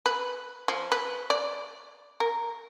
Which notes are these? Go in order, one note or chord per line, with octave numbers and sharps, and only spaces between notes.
B4
F3
B4
D5
A#4